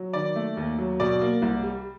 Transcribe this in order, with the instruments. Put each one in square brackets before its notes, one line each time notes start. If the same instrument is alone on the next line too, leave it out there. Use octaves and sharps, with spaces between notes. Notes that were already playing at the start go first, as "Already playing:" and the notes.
Already playing: [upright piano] F#3
D#3 D5
A3
D#2
F#3
B2 D5
A#3
C2
G3